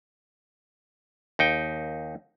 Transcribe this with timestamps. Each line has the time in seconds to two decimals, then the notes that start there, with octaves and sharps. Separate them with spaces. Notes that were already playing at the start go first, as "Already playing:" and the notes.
1.39 D#2 D#4 G5